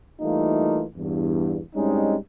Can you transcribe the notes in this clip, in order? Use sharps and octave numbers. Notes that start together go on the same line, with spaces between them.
E3 G3 A3 A#3 D#4 F4
E2 G2
A2 G3 G#3 C4 C#4 D#4